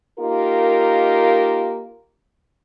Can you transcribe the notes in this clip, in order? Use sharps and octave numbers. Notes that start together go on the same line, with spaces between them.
A#3 D#4 F4 G4 A#4